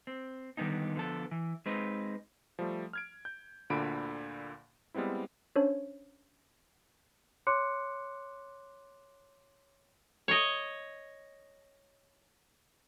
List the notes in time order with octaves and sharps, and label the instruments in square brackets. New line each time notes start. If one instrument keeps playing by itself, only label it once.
[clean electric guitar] C4
D3 D#3 G3 B3 C#4 D#4
D3 F3 B3 A4
E3
G#3 C4 D#4 B4
[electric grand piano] F3 G3 A3
F6 G#6 D7
G6
D2 A#2 D3 B5 D7
G3 G#3 B3 C4 E4
[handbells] C#4 D4 C5 C#5
[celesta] C#5 C6 D6 F#6 C#7
[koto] C#5 D#5